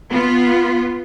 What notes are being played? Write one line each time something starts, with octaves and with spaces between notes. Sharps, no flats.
B3 F4